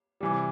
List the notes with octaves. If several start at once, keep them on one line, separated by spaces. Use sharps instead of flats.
C3 E3 G3